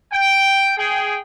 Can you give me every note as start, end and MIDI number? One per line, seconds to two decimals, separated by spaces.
0.12 0.73 79
0.78 1.20 68
0.78 1.20 79